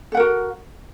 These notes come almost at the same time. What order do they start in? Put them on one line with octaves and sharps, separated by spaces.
A4 F#5 A#4 F#4